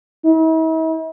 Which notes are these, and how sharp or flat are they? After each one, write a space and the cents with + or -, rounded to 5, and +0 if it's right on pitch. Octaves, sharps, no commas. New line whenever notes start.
E4 -45